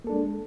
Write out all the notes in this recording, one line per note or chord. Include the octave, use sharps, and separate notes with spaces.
G#3 A#3 D4 A4